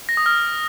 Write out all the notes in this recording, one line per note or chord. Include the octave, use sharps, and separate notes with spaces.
A#6
D#6
F6